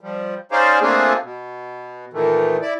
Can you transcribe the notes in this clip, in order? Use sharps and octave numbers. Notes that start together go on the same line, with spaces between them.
F3 G3
C#4 D#4 G#4 C5 D5 F5
A3 A#3 C4 D4 F4 G#4
B2
A#2 D#3 E3 A3
E4 D5